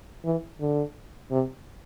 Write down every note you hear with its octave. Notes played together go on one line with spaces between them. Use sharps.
E3
D3
C3